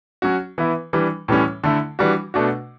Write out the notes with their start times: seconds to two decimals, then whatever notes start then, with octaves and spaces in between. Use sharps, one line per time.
0.22 F#3 C#4 F#4
0.58 E3 B3 E4
0.93 E3 G3 D4
1.28 A2 E3 G3 C#4
1.64 D3 A3 E4
1.99 E3 G3 D4 F#4
2.34 B2 A3 D4 F#4